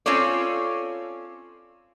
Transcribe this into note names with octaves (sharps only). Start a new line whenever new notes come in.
C4 C#4 F4 A4 C#5 D5